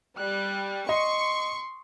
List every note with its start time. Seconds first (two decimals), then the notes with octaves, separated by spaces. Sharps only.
0.18 G3 F#6
0.89 D#5 C6 C#6